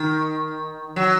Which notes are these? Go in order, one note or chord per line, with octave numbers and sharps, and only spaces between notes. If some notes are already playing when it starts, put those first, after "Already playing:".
Already playing: D#3
F#3